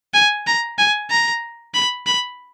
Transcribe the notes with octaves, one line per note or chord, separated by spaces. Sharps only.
G#5
A#5
G#5
A#5
B5
B5